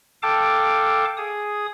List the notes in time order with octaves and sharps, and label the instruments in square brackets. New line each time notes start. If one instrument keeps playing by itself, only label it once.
[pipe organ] A4 F5 G5 A5 D6
G#4 D#6